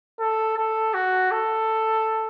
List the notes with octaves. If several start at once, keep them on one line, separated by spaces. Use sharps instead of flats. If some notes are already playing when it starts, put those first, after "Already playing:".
A4
A4
F#4
A4